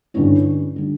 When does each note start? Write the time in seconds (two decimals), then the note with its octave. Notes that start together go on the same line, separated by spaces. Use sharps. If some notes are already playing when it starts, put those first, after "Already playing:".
0.14 G2 D3 G3 C#4 E4
0.76 D3 G3